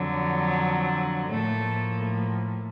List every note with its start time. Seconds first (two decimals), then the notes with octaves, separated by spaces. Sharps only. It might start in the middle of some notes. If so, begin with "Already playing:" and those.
Already playing: F2 D3 F#3
1.31 A2 F3 A3 A#3 A4